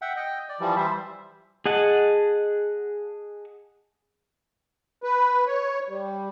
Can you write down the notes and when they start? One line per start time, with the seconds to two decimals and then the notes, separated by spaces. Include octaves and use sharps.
0.02 E5 F#5 G5
0.16 D#5 G5
0.49 D5
0.60 E3 F3 G3
0.76 E3 G3 C5 E5
1.66 G#4 D#5 F#5 A5
5.03 B4
5.47 C#5
5.89 G3